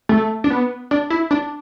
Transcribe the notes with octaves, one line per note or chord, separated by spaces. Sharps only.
A3
D4
B3
D4
E4
D4